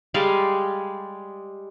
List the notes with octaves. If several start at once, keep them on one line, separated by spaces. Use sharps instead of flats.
G3 G#3 F5